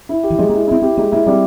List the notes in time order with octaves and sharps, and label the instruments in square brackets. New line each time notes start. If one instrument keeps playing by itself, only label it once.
[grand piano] E4
G4
[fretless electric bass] E3
[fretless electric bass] F3 [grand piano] G#3
[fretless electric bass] A#3
[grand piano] E4
[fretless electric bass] C4 [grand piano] E4
[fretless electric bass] C4 [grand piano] G4
[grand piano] G#3 [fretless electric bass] A#3
[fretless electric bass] A#3 [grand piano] E4
[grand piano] G3 [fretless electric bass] C4